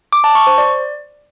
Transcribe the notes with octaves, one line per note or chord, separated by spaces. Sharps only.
D6
A5
C#6
C5
D5